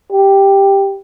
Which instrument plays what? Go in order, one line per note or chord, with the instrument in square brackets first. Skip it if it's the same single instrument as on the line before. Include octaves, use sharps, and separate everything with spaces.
[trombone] G4